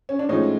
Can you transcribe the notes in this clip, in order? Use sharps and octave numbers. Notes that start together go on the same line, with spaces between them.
C#4
D4
A2 F3 G#3 C#4 D#4